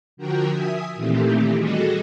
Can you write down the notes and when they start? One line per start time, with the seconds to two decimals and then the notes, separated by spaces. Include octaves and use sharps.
0.17 D3 F3 F#4 A#4 G5
0.48 E5 G#5 D#6
0.96 A#2 D#3 E3 A3 C4 G4
1.56 G3 F#4 G#4 A4 D#5